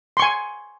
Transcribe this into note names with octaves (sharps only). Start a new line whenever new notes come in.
G#5 C6 C#6